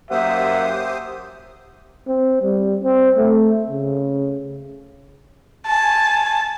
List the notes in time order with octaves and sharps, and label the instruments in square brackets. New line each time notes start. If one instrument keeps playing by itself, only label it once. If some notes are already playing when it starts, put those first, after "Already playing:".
[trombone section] F#2 A#3 [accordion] G4 C5 D#6 [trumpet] E5 [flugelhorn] F#5
[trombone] C4
G3
C4
A3
C#3
[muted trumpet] G#5 [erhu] A5